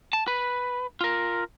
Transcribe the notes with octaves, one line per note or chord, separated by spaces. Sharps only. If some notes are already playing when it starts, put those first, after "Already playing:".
A5
B4
F4 A#4